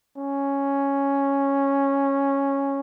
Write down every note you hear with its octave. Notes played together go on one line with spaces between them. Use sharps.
C#4